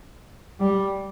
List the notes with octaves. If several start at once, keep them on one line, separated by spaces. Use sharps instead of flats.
G3